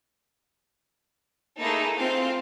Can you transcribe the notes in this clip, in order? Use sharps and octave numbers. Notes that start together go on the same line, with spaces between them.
A3 A#3 D#4 E4 G#4 A4
C4 F4 F5